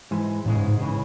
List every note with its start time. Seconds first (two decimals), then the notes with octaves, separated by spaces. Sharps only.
0.11 G#2 E3 G#3
0.45 E2 A2 C#3 G#3
0.57 G#2
0.68 G#2
0.79 C#2 C#3 E3